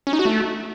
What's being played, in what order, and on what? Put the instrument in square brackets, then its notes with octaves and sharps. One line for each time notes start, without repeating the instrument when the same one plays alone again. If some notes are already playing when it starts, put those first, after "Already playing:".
[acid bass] C#4
D#4
F#4
A3